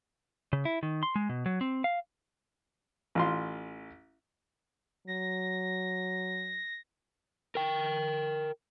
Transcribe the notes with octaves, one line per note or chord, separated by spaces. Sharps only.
C#3
E4
D#3
C6
G#3
B2
F#3
C4
F5
A1 F4 C6
F#3 A#6
A#4 G5